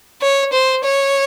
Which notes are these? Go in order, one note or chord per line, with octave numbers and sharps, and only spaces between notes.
C#5
C5
C#5